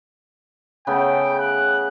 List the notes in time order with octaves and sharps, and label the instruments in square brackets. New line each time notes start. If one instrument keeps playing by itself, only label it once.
[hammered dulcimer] C#3 A3 B3 [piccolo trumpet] G5
[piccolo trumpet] F#6